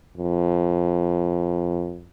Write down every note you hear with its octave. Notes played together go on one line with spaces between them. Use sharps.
F2